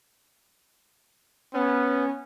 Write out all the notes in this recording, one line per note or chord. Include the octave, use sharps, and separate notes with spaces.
B3 C#4